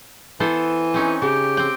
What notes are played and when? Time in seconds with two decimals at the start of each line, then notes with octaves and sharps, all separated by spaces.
0.40 E3 B3 A4 C5
0.94 C4 C#4 D#4
1.22 C#3 G4
1.57 C4 G5